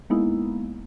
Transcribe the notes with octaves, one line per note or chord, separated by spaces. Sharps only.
G#3 A#3 B3 D#4 E4